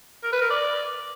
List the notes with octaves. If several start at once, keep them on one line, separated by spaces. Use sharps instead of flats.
A#4
B4
A#4
D5